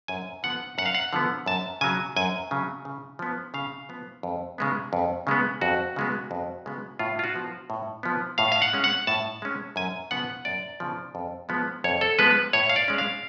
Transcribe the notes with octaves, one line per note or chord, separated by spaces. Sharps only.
F#2 G#5
D3 F3 B3 F#5
F#2 F#5
F5
F#5
D3 F3 B3
F#2 A5
C#3 F#3 G#5
F#2 G#5
C#3 F#3
C#3
F3 B3
C#3 F5
F3 B3
F2
C#3 G#3 B3
F2
C#3 G#3 B3
F2 F#4
C#3 G#3 B3
F2
C#3 G#3 B3
A2 F4
F4
F#4
F3 B3
A2
F3 B3
A2 F5
F5
F#5
G#3 C#4
F#5
A2 A5
G#3 C#4
F#2 G#5
C#3 F3 B3 F#5
F#2 D5
C#3 F3 B3
F2
F3 G#3 B3
F2 C#5
A4
F3 G#3 B3 B4
A2 C#5
F5
D5
G#3 C#4
F5